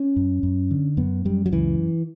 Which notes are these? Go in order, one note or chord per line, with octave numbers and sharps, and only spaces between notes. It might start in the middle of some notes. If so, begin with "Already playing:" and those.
Already playing: C#4
F#2
F#2
D3
F#2 B3
F#2 G3
F#3
C#2 E3